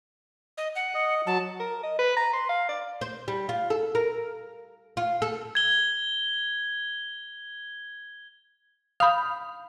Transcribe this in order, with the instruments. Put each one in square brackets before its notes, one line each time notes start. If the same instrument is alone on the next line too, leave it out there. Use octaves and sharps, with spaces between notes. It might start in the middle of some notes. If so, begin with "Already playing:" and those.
[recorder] D#5
F#5
[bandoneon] D#5
[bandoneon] F#3 [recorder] A5
[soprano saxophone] A#4
D#5
B4
A#5
C6
F5
D5
[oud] C5
G3
F4
A4
A#4
F4
A4
[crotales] G#6 G7
[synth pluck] F5 B5 [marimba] D#6 G6